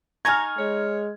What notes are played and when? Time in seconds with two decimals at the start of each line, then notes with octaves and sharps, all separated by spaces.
0.25 D#4 G#5 A#5 C#6 F6 G#6
0.58 G#3 C#5